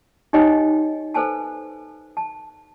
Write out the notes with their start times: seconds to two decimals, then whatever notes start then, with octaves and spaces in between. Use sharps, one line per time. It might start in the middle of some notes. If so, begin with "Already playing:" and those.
0.33 D#4 G4 C#5 D#5 G5 G#5
1.14 A4 B4 C5 G#5 A5
2.17 A5